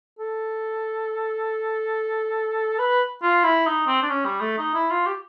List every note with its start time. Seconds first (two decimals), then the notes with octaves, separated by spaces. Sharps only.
0.19 A4
2.79 B4
3.23 F4
3.44 E4
3.66 D#4
3.87 C4
4.02 D4
4.09 C#4
4.25 G3
4.41 A3
4.58 D#4
4.74 E4
4.90 F4
5.06 G4